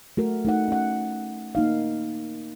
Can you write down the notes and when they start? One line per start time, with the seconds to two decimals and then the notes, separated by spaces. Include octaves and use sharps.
0.17 A3 F#4 A#4
0.45 A3 D#4 F#5
0.68 C#4 F#5
1.55 A#3 D#4 F5